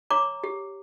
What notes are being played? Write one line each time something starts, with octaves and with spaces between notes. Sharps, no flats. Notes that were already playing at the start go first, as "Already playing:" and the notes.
C#5 A#5 D6
G4